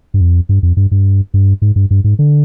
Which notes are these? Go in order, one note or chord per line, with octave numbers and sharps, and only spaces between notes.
G2
F2
G2
F2
G2
G2
G2
G#2
G2
G2
G#2
D3